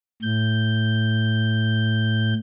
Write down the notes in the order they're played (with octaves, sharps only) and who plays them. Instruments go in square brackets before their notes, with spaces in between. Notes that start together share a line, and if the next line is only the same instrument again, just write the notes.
[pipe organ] A2 G6